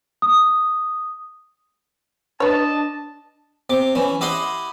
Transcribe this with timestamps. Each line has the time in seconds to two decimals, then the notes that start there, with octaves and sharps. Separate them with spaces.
0.22 D#6
2.40 D4 B4 C#5 D#5 A5
3.70 C3 D6
3.95 E3 C#4
4.21 E4 G4 D#5 F#5 C6